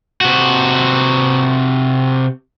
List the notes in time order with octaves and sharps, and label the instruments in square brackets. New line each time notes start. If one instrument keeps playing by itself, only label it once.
[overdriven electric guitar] C3 F#4